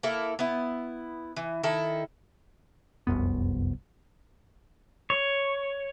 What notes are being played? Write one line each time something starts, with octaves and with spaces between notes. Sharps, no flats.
A#3 E4 A4
B3 E4
E3
D#3 E4 A4
F1 C2 F#2 B3
C#5